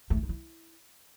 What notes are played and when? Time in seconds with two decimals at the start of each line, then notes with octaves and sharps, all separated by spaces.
0.10 A3
0.17 E4
0.23 D#4
0.29 E4